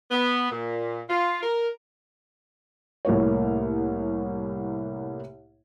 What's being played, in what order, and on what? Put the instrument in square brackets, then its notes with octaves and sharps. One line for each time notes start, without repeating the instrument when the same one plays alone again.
[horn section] B3
A#2
F4
A#4
[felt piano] C2 A2 A#3 C#5